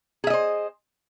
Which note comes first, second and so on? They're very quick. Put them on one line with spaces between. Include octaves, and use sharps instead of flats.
G#4 E5 D#5 C5